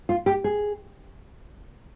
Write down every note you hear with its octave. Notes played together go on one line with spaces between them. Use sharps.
F4
G4
G#4